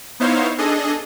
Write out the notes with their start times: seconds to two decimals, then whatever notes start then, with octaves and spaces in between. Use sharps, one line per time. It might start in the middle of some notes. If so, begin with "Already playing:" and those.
0.20 B3 D#4 E4 C5 C#5 F5
0.58 D4 G#4 A4 D#5